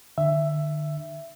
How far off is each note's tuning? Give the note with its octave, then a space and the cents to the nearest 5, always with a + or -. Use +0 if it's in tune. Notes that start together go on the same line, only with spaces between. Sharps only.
D3 +40 E5 +10